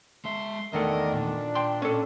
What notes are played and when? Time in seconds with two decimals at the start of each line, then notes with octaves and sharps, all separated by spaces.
0.25 G#3 E5 C6
0.73 E2 D#3 A3 D4 A#4 D#5
1.13 A#2 D4
1.55 G5 C6
1.82 C#4 A4